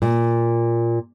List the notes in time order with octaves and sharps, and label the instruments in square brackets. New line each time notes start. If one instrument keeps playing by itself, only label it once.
[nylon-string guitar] A#2